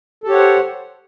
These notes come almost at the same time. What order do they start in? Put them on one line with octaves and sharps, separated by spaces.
A4 G4 C#5 F#5 C5